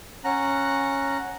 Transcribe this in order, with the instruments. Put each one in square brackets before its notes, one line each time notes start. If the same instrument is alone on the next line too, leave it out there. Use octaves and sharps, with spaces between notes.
[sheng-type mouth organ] C#4 F#5 A#5 F#6